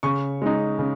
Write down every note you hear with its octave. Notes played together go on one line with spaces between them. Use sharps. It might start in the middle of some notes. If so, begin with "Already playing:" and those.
C#3 C#6
G#3 D#4
C#3